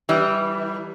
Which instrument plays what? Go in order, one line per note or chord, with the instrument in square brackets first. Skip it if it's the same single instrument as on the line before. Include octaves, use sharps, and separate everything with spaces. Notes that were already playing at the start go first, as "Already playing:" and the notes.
[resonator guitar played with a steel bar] E3 G3